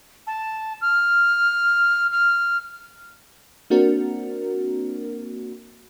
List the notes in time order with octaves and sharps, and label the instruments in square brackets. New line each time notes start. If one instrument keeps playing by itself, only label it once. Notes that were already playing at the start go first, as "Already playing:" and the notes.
[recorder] A5
F6
F6
[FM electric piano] A#3 C4 D4 F#4 A#4